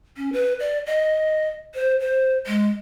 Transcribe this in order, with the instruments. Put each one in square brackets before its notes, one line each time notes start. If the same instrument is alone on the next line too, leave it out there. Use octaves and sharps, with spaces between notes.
[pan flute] C#4
B4
D5
D#5
C5
C5
G#3